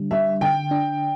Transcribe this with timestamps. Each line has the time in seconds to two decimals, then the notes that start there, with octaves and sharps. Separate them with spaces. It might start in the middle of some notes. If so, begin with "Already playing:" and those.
Already playing: D3 G3 D4
0.11 G3 E5
0.41 D3 G5
0.71 D4